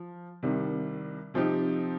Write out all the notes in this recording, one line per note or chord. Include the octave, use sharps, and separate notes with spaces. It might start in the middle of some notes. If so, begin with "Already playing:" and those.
Already playing: F3
C2 C3 D#3 G3
C3 F3 C4 D#4 G4